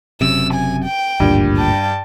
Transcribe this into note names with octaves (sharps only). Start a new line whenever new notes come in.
F#1 F#2 C3 E6
G#5
G5
G#1 D2 G2 A#2
G5 A5